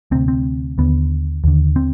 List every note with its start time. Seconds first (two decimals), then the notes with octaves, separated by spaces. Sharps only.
0.11 D2 C3 C4
0.28 C4
0.78 D#2 D3 B3
1.44 D#2 D3
1.76 C4